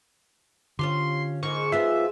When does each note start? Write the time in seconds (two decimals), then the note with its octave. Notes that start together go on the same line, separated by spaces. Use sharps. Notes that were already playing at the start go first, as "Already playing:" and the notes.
0.79 D3 C#4 F4 G4 C6
1.43 G#2 A#3 D#4 C#6
1.72 F3 B3 F4 E5